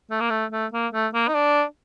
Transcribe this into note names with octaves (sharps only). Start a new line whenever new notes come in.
A3
A#3
A3
A3
A#3
A3
A#3
D#4
D4